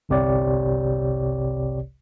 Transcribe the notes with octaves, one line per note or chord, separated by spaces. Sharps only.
G1 C2 C3 G4 C#5 D5